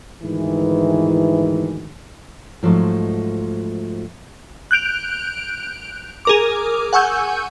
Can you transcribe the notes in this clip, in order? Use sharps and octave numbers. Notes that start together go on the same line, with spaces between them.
D2 G#2 D#3 E3
G#2 F3 F#3 A3 D#4
F#6 G6 D7 F7
G#4 A#4 D6
F#5 G#5 C#6 E6 G6